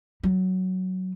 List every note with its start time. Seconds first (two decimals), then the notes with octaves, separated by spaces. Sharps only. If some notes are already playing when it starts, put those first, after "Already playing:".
0.23 F#3